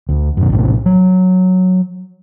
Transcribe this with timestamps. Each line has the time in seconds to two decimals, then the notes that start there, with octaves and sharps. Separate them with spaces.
0.09 D2
0.37 F#2 B2
0.50 A#1 A2 C3
0.86 F#3